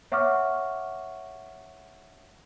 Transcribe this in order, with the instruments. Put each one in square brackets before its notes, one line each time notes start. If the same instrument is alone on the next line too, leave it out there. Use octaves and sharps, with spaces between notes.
[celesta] C#5 E5 F#5 C#6 D6 F6